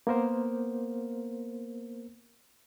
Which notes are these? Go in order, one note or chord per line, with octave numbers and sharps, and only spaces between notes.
A#3 B3 A#4 C5